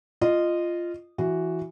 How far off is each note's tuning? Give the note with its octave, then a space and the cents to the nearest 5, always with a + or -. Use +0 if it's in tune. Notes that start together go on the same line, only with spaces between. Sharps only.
F4 -10 D#5 -15
E3 +5 F#4 +0